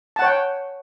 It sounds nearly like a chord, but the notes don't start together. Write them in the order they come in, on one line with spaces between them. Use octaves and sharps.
A5 F#5 C#5 G5